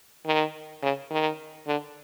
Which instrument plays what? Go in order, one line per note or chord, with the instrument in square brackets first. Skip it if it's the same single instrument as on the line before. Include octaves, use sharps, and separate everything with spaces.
[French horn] D#3
C#3
D#3
D3